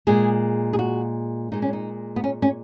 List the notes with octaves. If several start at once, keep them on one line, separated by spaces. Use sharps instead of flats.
A#2 G#3 G#4
G#4
F#4
A#2 G#3 D#4
C#4
D#4
B3
C#4
C#4